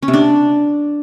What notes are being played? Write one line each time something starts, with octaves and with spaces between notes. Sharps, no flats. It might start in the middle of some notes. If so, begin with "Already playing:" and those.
C#4
C3
D4